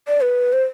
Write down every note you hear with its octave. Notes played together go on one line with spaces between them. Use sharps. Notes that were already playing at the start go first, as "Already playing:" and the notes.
D5
B4
C5